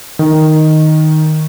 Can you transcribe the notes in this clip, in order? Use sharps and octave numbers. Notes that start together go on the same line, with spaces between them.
D#3